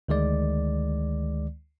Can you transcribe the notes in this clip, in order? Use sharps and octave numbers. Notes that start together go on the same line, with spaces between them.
D2 D#3 G#3 D5